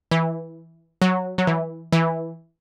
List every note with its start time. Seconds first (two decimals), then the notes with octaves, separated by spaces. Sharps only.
0.11 E3
1.02 F#3
1.38 F#3
1.47 E3
1.92 E3